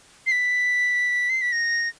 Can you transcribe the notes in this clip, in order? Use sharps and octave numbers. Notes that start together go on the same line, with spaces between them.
C7
B6
C7
B6
A#6